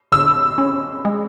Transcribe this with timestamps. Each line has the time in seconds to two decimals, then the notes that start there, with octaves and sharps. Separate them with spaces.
0.12 D3 E6
0.58 C#4
1.05 G#3